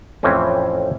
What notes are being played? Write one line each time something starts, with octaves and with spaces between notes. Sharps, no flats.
F2 A2 E3 C4 C#4